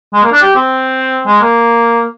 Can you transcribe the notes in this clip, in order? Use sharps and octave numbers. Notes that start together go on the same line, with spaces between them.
G#3
A#3
D4
G4
C4
G#3
A#3